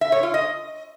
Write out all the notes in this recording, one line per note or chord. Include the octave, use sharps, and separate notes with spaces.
E5
C#5
F4
D#5